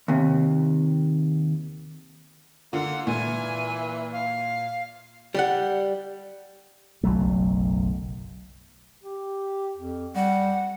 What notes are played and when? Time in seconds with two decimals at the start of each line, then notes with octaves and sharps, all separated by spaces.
0.08 D#2 C3
2.73 D3 A#3 F4 F#5
3.07 A#2 E3 G#5
4.13 F5
5.34 G3 D5 F#5
7.04 F#1 B1 F#3 A3
9.03 G4
9.77 F2
10.15 G3 F#5